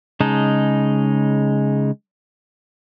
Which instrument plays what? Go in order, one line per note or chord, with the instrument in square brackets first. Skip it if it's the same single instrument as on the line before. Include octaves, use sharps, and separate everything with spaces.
[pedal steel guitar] C#3 G#3 D#4 A5